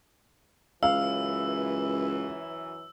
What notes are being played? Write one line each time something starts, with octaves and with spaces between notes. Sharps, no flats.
C#2 F#2 E3 F5 E6